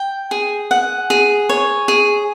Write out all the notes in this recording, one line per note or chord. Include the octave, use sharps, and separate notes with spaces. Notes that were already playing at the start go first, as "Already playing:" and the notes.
Already playing: G5
G#4
F#5
G#4
C#5
G#4